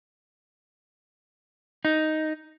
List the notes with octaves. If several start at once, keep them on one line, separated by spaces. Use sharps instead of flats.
D#4